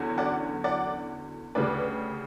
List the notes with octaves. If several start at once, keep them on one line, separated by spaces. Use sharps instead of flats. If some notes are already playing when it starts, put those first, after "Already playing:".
Already playing: E2 D3 F#3 C#4
D5 F#5
D5 F#5
D2 C#3 G3 B4 D5